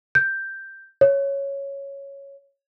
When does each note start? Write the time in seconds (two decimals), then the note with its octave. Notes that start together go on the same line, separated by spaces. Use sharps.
0.15 G6
1.01 C#5